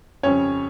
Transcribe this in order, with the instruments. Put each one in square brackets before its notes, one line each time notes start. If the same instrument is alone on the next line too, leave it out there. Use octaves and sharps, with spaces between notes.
[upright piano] F2 C#3 G3 C4 C#4 C#5